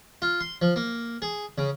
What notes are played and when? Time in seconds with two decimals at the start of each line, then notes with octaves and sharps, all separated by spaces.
0.22 F4
0.40 C6
0.62 F3
0.76 A#3
1.22 G#4
1.58 C#3